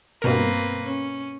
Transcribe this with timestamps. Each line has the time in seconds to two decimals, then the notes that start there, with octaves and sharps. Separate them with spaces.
0.22 G2 B2 A#3 C4 A#4 B4
0.85 C#4